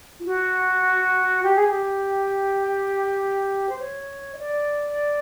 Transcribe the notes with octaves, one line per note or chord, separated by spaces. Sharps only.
F4
F#4
G4
G#4
G4
C5
C#5
D#5
D5